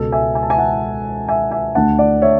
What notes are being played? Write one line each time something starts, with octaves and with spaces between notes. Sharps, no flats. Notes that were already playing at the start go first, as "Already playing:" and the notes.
Already playing: C#2 B2 G#3 A4
E5 G#5
G#5
A5
E5 G#5
F#5 A5
E5 G#5
E5 G#5
D2 D3 A3 F#5 A5
D5 F#5
C#5 E5